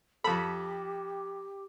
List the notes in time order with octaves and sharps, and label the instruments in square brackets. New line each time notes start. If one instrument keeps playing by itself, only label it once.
[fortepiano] F2 A4 [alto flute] G4 [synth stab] B5